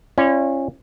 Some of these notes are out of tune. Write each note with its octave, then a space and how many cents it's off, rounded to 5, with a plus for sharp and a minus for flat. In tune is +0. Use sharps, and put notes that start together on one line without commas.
C#4 -25 F4 -40 D5 +0